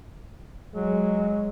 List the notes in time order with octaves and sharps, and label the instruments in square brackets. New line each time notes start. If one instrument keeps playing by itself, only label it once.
[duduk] F#3 [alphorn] G#3